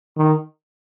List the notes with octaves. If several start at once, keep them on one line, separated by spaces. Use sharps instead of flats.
D#3